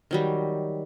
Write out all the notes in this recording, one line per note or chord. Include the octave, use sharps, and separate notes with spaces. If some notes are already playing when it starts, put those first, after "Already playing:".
D#3 F#3 G3